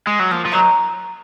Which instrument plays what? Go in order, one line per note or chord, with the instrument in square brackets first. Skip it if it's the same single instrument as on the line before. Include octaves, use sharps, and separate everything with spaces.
[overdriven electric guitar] G#3
F#3
[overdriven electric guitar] F3 [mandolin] A#3
[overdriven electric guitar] F3
[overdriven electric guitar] F#3 [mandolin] D#4 A#4 C#5